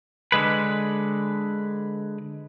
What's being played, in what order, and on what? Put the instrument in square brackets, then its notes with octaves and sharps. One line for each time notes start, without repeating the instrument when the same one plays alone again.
[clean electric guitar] D3 G#3 B4